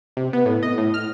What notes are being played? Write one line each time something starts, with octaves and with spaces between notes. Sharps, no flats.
C3
B3
A2
D#5
A2
F6